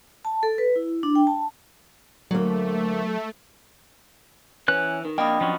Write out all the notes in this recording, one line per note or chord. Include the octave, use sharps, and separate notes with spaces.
A5
A4
B4
E4
D4
G5
A5
D2 F#3 A3 A#3
E3 C#4 B4 F#6
D#3
F2 A#3 D4 D#5 G5 B5 D#6
F3 F#3 C#4